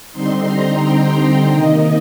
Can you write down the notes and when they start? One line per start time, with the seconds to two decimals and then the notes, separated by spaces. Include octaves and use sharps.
0.12 D3 G3 C4 D#4 C6
0.47 A#5
0.82 G5
1.53 C3 D#3 A#3 D#4 D#5